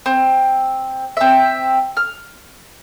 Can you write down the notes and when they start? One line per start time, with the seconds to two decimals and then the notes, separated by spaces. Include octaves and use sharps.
0.06 C4
1.17 C4 E5
1.97 F6